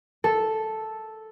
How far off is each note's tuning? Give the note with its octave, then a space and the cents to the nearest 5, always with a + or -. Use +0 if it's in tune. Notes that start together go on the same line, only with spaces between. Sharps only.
A4 -5